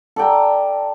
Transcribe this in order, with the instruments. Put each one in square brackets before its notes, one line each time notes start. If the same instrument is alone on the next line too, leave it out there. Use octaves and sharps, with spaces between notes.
[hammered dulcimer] A4 D5 G5 A#5